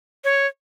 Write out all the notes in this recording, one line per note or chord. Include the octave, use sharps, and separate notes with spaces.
C#5